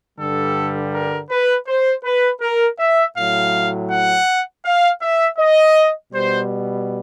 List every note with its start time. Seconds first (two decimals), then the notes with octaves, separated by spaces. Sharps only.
0.18 G2 D3 G3 A4
0.93 A#4
1.30 B4
1.67 C5
2.03 B4
2.40 A#4
2.78 E5
3.16 A2 F#3 F5
3.90 F#5
4.64 F5
5.01 E5
5.38 D#5
6.12 B2 G3 C5